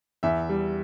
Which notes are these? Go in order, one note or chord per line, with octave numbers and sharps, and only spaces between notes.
E2 E5
G3